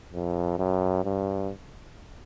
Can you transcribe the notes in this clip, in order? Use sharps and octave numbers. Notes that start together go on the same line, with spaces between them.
F2
F#2
G2